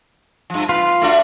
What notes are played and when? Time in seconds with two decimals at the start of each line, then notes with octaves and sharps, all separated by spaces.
0.50 G2 F3
0.69 F4 B4
1.01 A3 D4 F#4